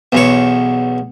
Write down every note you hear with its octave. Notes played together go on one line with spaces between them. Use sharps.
B1 E2 C#5